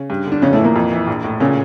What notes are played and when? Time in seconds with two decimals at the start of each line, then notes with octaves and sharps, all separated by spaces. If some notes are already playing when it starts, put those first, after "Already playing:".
Already playing: C#3 C#4
0.10 G2
0.26 D3
0.32 D4
0.42 F2 C#3 C#4
0.53 A2 A3
0.59 E3
0.64 A#2 A#3
0.76 F2
0.92 E3
1.07 A#1
1.24 A2
1.40 A#2 C#3 C#4